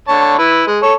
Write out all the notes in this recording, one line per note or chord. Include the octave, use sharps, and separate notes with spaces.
D3 C#5 A5
E4 B4
G#3
A4 C#5